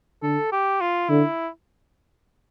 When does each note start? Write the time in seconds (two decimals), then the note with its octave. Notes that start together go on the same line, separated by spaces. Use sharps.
0.23 D3 A4
0.52 G4
0.81 F4
1.09 D3 E4